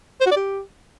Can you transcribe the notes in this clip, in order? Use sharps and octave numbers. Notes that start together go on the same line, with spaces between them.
C5
F#4
D5
G4